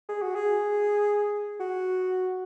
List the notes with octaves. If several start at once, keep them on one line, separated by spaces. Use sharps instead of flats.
G#4
F#4
G#4
F#4